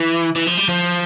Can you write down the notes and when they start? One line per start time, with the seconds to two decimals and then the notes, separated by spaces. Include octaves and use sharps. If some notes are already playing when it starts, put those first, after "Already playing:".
Already playing: E3
0.36 E3
0.47 F3
0.58 G3
0.69 F3